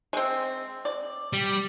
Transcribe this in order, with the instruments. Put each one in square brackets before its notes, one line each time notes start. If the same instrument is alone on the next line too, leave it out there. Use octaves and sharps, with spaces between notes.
[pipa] G#3 C4
D5
[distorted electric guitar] G3